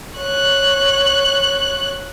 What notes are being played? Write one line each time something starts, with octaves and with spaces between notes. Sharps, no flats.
C#5 F#6